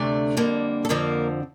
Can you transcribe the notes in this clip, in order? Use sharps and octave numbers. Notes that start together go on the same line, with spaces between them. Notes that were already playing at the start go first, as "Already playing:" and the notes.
Already playing: D2 C3 A3 D4 D5
F2 D3 G3 A#3
A4
F2 D3 F3 A#3 C4 A#4